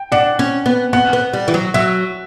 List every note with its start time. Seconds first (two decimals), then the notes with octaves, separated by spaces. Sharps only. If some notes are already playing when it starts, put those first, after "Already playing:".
Already playing: G5
0.12 D4 F#5
0.39 C#4
0.66 B3
0.93 B3 F#5
1.13 B3
1.33 G3
1.48 E3
1.54 F#3
1.74 F#3 E5